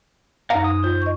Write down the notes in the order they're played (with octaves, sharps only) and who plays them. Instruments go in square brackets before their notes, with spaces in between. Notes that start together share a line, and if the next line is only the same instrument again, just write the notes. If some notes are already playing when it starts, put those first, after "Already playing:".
[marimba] F#2 D#4 [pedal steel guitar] F5 F#5 A#5
[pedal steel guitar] D#6
[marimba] F4 [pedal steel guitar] C5
[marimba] D#5 C#6